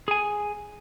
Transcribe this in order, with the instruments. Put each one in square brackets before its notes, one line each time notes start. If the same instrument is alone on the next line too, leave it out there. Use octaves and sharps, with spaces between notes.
[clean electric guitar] G#4 G#5